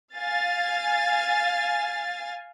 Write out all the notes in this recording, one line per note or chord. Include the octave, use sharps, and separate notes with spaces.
F5 G#5 A6